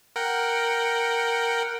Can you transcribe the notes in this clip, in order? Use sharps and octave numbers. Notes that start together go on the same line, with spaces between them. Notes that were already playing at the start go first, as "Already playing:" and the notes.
A#4 F#5 G5